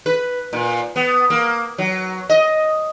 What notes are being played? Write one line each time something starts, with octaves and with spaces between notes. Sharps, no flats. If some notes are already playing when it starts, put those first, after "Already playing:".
B4
A#2
B3
A#3
F#3
D#5